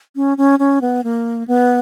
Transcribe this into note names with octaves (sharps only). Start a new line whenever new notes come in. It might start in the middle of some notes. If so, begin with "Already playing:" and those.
C#4
C#4
C#4
B3
A#3
B3